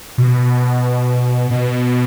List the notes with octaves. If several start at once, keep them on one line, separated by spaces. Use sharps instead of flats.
B2
B2